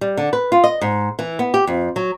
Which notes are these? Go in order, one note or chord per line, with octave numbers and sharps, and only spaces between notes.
G3
D3
B4
F4
D#5
G#2
E3
B3
G4
F2
F#3